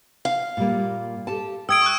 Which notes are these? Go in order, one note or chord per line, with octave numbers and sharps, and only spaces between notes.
F5
A#2 G3 A#3
G4 A4 A5
E5 G5 D#6 E6 G#6 D7
C#6 F#6